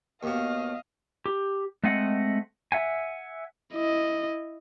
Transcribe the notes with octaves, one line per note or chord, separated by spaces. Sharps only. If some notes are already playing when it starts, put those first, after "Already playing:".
D#2 B2 D#5 F5
G4
G#3 A3 C4 D#5 F#5
E5 F#5 G#5
E4 D#5